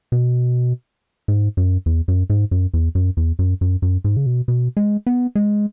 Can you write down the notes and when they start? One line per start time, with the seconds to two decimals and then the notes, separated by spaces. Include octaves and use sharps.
0.12 B2
1.28 G#2
1.57 F#2
1.86 E2
2.08 F#2
2.30 G#2
2.51 F#2
2.74 E2
2.95 F#2
3.17 E2
3.39 F#2
3.61 F#2
3.82 F#2
4.04 G#2
4.17 C#3
4.26 B2
4.48 B2
4.77 G#3
5.07 B3
5.35 G#3